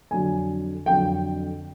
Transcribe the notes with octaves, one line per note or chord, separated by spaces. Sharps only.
F2 D3 F#3 G#5
F2 D3 F#3 G5